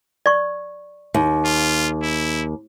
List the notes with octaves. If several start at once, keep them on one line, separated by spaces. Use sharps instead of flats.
D5 C#6
D#2
F4
E4